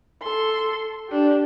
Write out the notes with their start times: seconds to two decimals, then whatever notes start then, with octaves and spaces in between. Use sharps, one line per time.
0.22 A4 C6
1.09 D4 G4